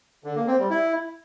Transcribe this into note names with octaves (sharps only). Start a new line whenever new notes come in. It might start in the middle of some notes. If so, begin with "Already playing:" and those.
D3
A#3
C4
G3
E4